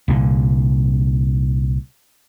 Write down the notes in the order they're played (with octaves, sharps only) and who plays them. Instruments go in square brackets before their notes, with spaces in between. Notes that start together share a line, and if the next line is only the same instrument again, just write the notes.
[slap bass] C2 A#2 D3